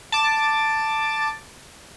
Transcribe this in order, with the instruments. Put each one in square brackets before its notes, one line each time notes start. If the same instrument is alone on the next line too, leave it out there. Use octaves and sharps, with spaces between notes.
[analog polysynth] A5 D6